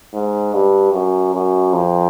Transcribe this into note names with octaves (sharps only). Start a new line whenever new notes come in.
G#2
G2
F#2
F#2
F2